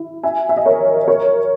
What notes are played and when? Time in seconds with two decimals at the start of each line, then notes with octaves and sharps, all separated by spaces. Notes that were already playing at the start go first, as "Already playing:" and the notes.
Already playing: E4
0.23 E5 G#5
0.49 E5
0.57 D#5
0.66 A#4 C#5
1.08 A#4 C#5